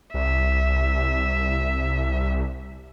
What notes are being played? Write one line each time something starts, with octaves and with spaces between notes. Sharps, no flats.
C2 E5